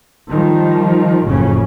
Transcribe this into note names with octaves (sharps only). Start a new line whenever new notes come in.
D#3 F3 G3
F#1 F2 A2 C#3 C#4